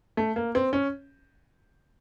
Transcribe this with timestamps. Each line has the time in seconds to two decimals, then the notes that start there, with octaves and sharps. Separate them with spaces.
0.17 A3
0.36 A#3
0.55 C4
0.73 C#4